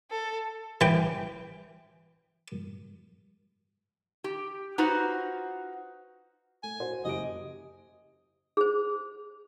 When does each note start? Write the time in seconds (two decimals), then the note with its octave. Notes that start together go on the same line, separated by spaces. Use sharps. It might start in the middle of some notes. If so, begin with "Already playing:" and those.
0.11 A4
0.81 E3 G5
4.24 G4
4.78 D#4 F4 F#4 B4 C5
6.63 A3 G#5
6.80 F#4 C5 F#5
7.05 F#1 G4 D#5 D7
8.57 G#4 C5